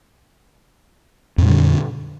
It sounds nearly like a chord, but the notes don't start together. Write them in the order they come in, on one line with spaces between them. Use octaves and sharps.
F2 A#2 G3 D3